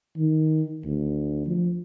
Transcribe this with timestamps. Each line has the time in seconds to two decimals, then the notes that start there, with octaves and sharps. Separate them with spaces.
0.17 D#3
0.84 D2
1.47 F3